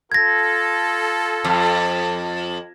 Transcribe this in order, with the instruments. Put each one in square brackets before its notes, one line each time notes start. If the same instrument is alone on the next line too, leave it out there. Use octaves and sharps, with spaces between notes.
[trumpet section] F4 A4 [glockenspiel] G#6 A#6
[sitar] F2